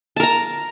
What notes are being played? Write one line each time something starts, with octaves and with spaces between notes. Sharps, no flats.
A#4 A5 A#5